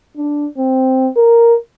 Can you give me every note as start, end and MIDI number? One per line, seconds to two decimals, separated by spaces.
0.17 0.46 62
0.58 1.09 60
1.16 1.55 70